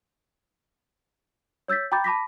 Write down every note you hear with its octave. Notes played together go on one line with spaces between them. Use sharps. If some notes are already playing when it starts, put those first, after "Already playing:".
C#5 E6 G6 A6 B6
G5 A#5 B5 D6 G6 A6
A5 B5 D6 A#6 B6